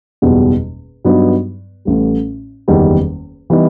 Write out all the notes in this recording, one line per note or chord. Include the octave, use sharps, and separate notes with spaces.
F#1 E2 B2 G3 D#4
G2 F#3 B3 D#4
A1 A2 G3
F#1 E2 D#3 G3
E3 G3 B3 D#4